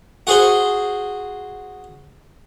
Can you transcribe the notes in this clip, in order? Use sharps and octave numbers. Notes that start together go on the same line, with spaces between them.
F#4 G#4 C5